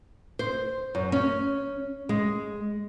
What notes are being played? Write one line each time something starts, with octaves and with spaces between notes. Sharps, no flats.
C5
F#2
C#4
G#3